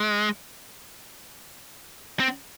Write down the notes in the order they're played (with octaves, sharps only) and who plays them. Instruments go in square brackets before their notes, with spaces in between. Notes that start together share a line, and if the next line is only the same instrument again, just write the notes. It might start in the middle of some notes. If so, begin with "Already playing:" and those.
Already playing: [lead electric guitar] G#3
C4